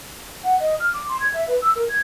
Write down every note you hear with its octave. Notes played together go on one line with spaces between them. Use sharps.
F#5
D#5
F6
D6
C6
G#6
E5
B4
E6
A#4
G#6